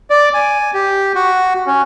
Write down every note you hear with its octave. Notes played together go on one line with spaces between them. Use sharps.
D5
G#5
G4
F#4
C#4